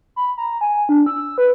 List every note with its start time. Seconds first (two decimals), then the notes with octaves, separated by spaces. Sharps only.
0.16 B5
0.37 A#5
0.61 G#5
0.89 D4
1.06 E6
1.38 B4